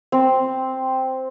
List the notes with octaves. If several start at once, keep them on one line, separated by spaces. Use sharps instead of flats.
C4